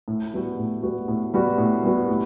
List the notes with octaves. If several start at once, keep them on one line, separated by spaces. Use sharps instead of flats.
A2
G3 B3 F#4
A2
G3 B3 F#4
A2
G3 B3 F#4
A2
G3 B3 F#4
A2